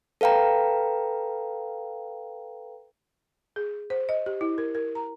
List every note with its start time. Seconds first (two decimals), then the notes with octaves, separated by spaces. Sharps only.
0.21 A4 B4 F5 G5 A#5
3.56 G#4
3.90 C5
4.09 D#5
4.26 G4
4.41 E4
4.58 A#4
4.75 A#4
4.95 A#5